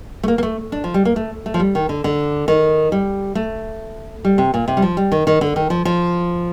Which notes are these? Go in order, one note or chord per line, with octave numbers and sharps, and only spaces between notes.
A3
A#3
A#3
A3
D4
F3
G3
A#3
A3
A3
F3
G3
D#3
D3
D3
D#3
G3
A3
G3
C3
A#2
C3
G3
F3
G3
D#3
D#3
D3
D#3
F3
F3